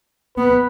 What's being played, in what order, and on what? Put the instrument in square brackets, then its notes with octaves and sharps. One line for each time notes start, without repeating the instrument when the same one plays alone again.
[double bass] B3 [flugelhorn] B4